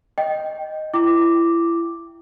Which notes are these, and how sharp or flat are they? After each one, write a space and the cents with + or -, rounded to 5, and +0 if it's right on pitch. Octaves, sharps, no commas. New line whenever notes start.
D#5 +0 G5 +0
E4 +30 G5 +0 D6 +0